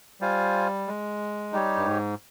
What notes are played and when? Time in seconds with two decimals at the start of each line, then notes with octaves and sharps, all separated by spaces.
0.21 G3 F4 C5 F5 G#5
0.87 G#3
1.52 G3 D#4 G4 C#5
1.77 G2
1.85 G#2